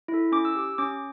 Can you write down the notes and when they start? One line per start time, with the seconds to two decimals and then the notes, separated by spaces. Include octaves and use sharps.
0.08 E4
0.14 A4
0.32 C#4 D6
0.45 E6
0.56 G4 D6
0.78 C#4 D6